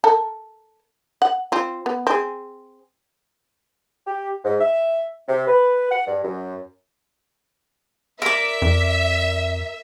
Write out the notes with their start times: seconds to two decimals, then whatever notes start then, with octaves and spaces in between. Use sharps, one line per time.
0.04 A4 A#4
1.22 F#5
1.52 C4 F4
1.86 B3
2.07 C4 G#4
4.07 G4
4.45 G#2
4.61 E5
5.29 C3
5.48 B4
5.91 F#5
6.07 G2
6.24 F#2
8.22 A#4 D5 E5
8.62 F2